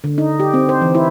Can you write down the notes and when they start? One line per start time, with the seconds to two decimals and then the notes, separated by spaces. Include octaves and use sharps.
0.04 D3
0.18 D#4
0.40 G4
0.54 C4
0.69 C5
0.82 E3
0.95 E4